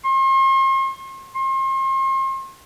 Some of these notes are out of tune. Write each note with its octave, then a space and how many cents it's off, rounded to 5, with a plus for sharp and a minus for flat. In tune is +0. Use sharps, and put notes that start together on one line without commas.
C6 +45
C6 +40